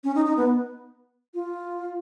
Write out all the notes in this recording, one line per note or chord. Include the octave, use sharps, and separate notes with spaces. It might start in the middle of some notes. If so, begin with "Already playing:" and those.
C#4
D#4
D#4
B3
F4